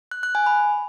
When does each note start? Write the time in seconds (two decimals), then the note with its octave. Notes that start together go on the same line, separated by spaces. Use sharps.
0.11 F#6
0.23 F#6
0.35 G#5
0.46 B5